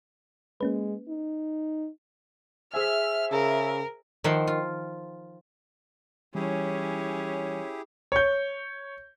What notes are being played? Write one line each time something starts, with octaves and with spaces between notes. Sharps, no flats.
G#3 A#3 C#4 B4
D#4
G#4 C5 E5 G#5 F6
C#3 A#4
D#3 F3 E5 F#5 G5 C6
F4
E3 G3 C#4 E4 G4 G#4 C#5
C#5 G6